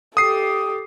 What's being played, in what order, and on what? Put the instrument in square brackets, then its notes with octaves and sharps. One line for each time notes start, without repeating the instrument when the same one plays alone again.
[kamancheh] G4 A4 [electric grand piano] D#6 C7